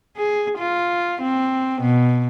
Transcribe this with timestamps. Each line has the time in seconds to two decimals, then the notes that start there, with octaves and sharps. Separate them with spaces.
0.17 G#4
0.58 F4
1.22 C4
1.82 B2